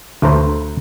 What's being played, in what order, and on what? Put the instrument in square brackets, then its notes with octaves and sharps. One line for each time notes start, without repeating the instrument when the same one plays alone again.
[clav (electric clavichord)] D2 A3 B4 C5 A#5